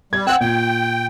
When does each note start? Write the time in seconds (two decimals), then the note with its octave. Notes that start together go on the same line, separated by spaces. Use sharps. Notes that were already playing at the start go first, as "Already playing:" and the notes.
0.13 G3 G#6
0.27 C4 F#5 G5 E6 F#6
0.41 A#2 G5